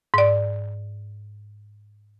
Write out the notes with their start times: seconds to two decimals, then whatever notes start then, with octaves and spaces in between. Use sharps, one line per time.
0.14 G#2 D5